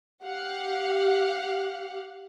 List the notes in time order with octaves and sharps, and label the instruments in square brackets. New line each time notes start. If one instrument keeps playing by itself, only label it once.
[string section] G4 F5 F#5